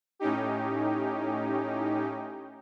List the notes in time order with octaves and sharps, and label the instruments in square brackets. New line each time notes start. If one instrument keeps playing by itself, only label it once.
[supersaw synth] A2 C#4 D#4 G4